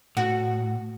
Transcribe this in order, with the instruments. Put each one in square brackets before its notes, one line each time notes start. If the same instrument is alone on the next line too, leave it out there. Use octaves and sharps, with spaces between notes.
[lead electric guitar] A2 [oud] F#4